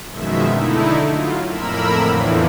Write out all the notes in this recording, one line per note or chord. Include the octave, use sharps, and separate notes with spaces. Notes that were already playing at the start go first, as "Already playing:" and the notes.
F#2 B2 D#3 F3 G#3 E5
D3 A3 D#4 E4
F#3 F4
F2 A2 A#3 A#4 B5 E6
E2 A2 D3 E3 F3